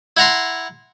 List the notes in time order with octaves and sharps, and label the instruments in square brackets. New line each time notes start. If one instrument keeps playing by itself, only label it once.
[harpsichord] E4 F#5 A#5 C6